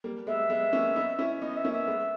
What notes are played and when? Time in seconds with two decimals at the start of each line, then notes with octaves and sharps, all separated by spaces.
0.04 G3 A#3
0.27 G#3 B3 E5
0.50 G#3 B3
0.73 A#3 C#4
0.96 B3 D#4
1.19 C#4 E4
1.42 B3 D#4 D#5
1.56 E5
1.64 A#3 C#4
1.72 E5
1.87 G#3 B3